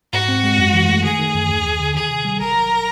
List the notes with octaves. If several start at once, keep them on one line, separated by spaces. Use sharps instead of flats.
G#2 F#4
C4
G#3
F#2
E3
A3
D#3 G#4
D#3
F#2
D#2
D#2
D3
D#3 G#4
C3
G3
G1 A#4
F#3